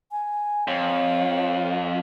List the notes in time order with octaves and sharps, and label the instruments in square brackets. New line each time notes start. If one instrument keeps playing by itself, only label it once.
[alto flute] G#5
[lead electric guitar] F2 [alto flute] C#5